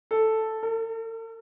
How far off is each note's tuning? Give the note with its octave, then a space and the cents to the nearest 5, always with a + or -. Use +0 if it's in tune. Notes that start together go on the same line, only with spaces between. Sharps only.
A4 +0
A4 +45